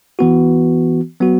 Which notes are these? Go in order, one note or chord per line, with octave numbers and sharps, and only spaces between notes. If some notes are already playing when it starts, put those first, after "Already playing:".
E3 B3 F#4
F#3 B3 F#4